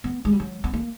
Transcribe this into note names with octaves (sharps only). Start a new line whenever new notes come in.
B3
G#3
G3
F#3
B3
A#3